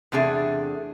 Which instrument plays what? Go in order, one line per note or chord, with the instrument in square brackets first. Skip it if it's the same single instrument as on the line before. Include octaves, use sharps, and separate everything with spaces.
[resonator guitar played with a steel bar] E2 C3 A3 D4 G#4